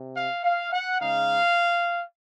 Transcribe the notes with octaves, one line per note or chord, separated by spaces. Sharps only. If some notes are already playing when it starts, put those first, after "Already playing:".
Already playing: C3
F5
F5
F#5
C#3 G#3 D#4 F5